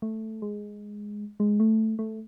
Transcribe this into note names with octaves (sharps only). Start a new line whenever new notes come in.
A3
G#3
G#3
A3
A3